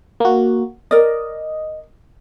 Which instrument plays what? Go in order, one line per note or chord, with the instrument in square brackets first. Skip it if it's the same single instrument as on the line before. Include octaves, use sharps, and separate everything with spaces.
[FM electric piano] A#3 F#4
[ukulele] A#4 D5 [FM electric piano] D#5